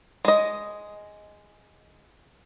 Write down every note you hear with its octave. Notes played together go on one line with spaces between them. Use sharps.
G#3 D#5